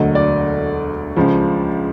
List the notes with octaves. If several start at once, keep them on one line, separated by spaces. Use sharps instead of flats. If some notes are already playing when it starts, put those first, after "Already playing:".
Already playing: E1 D2 D3 F#3 A3 D#5
D5
C#2 C#3 F3